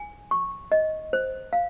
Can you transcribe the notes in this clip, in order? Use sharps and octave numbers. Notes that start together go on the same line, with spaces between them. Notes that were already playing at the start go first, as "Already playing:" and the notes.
Already playing: G#5
C#6
D#5
C5
F5